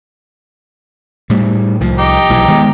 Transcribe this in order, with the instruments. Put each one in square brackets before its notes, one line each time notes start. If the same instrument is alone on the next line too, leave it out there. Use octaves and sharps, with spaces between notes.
[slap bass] A2 G3
C2 F3
[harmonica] D#4 G4 A#5
[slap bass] B1 E3 F#3
D#3 G#3 B3